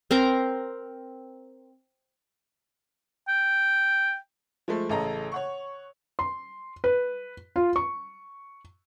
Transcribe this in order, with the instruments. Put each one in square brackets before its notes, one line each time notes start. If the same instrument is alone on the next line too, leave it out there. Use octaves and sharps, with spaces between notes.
[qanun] C4 A#4 A#5 C6
[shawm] G5
[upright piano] F3 G#3 A3
A1 C#3 A4 D#5 A#5
C#5 F#5 C#6
[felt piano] C6
B4
F4
C#6